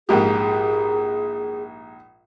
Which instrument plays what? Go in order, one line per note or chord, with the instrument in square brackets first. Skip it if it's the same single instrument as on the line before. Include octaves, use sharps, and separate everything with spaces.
[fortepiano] A#1 G#2 G4 [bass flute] G#4